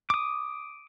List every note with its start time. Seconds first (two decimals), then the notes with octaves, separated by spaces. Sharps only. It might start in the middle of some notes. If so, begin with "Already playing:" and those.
0.10 D6 D#6